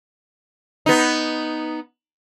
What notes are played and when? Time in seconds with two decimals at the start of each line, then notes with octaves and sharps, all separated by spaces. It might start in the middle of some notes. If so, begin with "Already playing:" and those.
0.86 B3 D#4